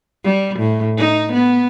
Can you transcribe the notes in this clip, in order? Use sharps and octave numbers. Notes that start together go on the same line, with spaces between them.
G3
A2
D#4
B3